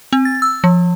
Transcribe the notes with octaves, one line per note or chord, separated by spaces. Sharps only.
C4
A6
E6
F3